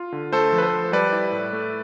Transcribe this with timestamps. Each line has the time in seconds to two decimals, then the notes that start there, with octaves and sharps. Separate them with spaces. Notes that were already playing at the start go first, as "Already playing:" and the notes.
Already playing: F4
0.12 D3
0.32 A3 A4 C5
0.52 F3
0.58 B4
0.62 A4 C5
0.73 F3
0.92 G3 B4 D5
1.12 E4
1.32 A2
1.53 A3